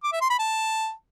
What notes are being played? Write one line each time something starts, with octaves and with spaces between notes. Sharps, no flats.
D6
E5
C6
B5
A5